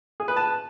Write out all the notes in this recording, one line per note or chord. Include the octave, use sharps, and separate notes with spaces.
G#4
B4
A5